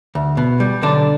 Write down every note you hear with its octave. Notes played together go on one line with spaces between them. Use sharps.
D2
B2
G3
B1 D3 D4